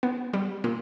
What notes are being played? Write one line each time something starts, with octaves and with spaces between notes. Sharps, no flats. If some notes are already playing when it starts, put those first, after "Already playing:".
B3
G3
A#2